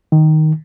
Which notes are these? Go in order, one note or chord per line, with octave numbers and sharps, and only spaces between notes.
D#3